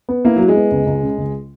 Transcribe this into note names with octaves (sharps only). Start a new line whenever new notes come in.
B3
A#3 E4
F#3 E4
G#3
B3
C#2
C#2
C#3
C#2